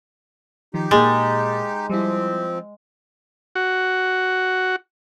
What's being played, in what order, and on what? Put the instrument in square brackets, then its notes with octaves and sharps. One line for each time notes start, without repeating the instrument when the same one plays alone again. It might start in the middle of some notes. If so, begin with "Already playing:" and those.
[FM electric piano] D#3 F3 [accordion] D#4 G4
[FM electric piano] A#2 A#3 A6 [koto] G#3
[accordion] F3 C4 [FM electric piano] G3 E4
[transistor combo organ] F#4